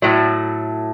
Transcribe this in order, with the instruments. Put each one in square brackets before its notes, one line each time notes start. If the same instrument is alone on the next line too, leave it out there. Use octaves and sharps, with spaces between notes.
[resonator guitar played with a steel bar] A2 F#3 A3